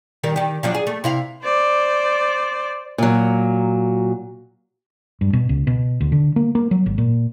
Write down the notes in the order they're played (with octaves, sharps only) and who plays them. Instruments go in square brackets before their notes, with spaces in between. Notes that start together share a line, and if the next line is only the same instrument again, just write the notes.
[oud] D#3 G3 A#4
D#3 G4
F3 F#3 D4
G#4
A3
C3 E4 F5
[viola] C5 D5
[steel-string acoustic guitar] A#2 F#3
[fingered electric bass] G2
B2
C#2
B2
D2
D3
A#3
A#3
F#3
G#1
A#2